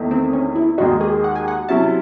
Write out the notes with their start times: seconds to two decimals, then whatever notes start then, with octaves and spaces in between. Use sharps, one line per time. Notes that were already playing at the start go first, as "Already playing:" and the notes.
Already playing: E2 D#3 A3 D#4
0.11 C4
0.33 C#4
0.56 E4
0.78 D#2 D#3 G#3 D#4 F#4
1.01 G#4
1.24 F#5
1.36 G#5
1.48 F#5
1.69 C3 F#3 C#4 E4 A5